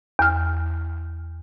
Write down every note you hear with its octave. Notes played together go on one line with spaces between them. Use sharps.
E2 F6